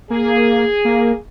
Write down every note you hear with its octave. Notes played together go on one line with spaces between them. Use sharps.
A#3 G#4
A#3